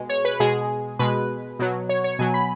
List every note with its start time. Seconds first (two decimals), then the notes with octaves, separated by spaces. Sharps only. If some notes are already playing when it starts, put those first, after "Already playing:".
Already playing: B2 G#3
0.09 C#5
0.25 B4
0.40 B2 G#3 G#4
0.99 B2 G#3 B4
1.59 B2 F#3
1.89 C#5
2.04 C#5
2.19 B2 F#3 G#5
2.34 B5